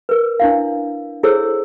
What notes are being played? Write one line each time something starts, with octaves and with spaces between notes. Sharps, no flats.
A#4 B4
D4 E4 F5
E4 G#4 A4 C5 C#5 E6